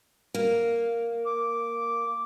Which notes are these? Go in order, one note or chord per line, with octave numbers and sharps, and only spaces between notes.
A#3
D6